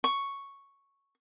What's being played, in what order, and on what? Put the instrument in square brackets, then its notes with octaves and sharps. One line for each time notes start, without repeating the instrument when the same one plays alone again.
[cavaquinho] C#6